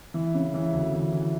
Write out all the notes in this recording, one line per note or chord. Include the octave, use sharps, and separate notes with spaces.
E3
C#3
E3
D2
E3
E3